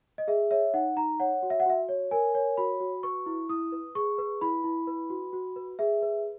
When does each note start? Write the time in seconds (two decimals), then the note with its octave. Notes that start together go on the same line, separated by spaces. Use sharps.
0.18 D#5
0.28 G#4 E5
0.51 C#5 E5
0.74 D#4 F#5
0.96 D#4 A#5
1.20 C#5 F#5
1.43 F#4
1.50 E5
1.60 F#5
1.66 F#4 E5
1.89 C#5
2.11 A#4 G#5
2.35 C#5
2.57 F#4 B5
2.81 F#4
3.03 B4 C#6
3.26 E4
3.49 E4 D#6
3.72 B4
3.95 G#4 C#6
4.18 B4
4.41 E4 B5
4.64 E4
4.87 B4
5.10 F#4
5.33 F#4
5.56 B4
5.79 G#4 E5
6.02 B4